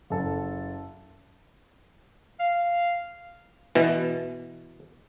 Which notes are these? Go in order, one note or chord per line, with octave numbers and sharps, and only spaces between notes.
F#1 A4
F5
B2 E3